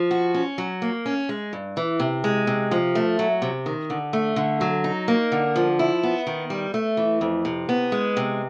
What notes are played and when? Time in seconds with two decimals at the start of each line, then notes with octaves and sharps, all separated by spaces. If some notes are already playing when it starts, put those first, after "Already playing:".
Already playing: F3
0.11 F#4
0.34 C#4
0.58 F#3
0.82 A#3
1.06 C#4
1.29 G#3
1.53 G2
1.77 E3
2.00 C3
2.24 G#3
2.47 C3
2.71 F3
2.95 A3
3.19 F#3
3.42 C3
3.66 D#3
3.90 D3
4.13 A3
4.36 D3
4.61 F#3
4.84 D#4
5.08 A#3
5.32 D3
5.56 F3
5.79 E4
6.03 B3
6.27 D#3
6.50 G3
6.74 A3
6.97 E3
7.21 F2
7.45 C3
7.69 B3
7.92 G#3
8.17 C3